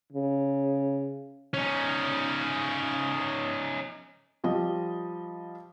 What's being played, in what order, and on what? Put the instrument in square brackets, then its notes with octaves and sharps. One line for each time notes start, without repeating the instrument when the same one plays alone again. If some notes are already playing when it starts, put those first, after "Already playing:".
[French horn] C#3
[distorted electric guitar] C#4 D#4
[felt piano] F3 G3 D#5